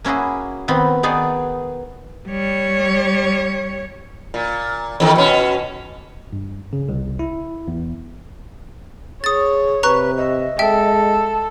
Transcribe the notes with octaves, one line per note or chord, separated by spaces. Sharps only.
A#3 C#4 E4 F#4 G#4
D#3 B3 C4 B5
D#3 B3 D#4 G#4 D5
G3 C#5
A#2
E2 D#3
B2 C#4
G2
C#3
C2
E4
E2
G#4 C#5 D#6 A6
C3 B4 A#5 C#6 F#6
D#5 E5
G#3 A4 E5 G5